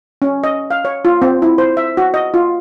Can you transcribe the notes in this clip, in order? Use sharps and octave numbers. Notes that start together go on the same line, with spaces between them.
C#4
D#5
F5
C#5
F4
C4
E4
C5
E5
F#4
D#5
F4